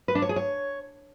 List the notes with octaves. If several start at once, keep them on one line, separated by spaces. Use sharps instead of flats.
B4
D4
C#5
G#4
C#5